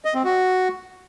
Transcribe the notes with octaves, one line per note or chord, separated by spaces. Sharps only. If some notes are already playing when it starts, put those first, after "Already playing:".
D#5
C4
F#4